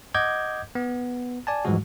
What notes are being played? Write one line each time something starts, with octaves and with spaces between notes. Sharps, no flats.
D#5 F#5 D6 G6 G#6
B3
D5 G#5 A5
G#2 E3 F3 G3 G#3 F#4